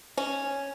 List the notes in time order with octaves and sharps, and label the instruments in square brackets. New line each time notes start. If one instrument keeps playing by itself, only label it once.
[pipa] C#4